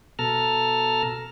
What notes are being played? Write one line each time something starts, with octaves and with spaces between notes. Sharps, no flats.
B2 A4 A5 A#5 F6